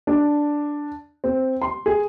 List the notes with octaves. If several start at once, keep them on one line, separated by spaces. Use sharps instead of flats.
D4
C4
C6
G#4